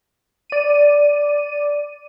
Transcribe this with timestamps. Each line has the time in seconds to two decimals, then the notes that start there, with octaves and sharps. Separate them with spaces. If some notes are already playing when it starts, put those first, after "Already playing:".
0.50 D5 D#7